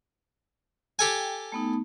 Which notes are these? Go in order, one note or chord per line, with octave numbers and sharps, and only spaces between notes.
G4 A4 G5 G#5
A3 B3 D#4